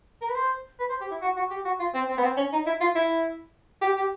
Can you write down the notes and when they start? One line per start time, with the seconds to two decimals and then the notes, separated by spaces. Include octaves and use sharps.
0.22 A#4
0.29 B4
0.35 C5
0.79 B4
0.89 C5
1.01 G4
1.11 E4
1.22 F#4
1.37 F#4
1.50 G4
1.65 F#4
1.80 F4
1.94 C4
2.09 C4
2.18 B3
2.24 C4
2.37 C#4
2.53 D#4
2.66 E4
2.80 F4
2.95 E4
3.82 G4
3.97 G4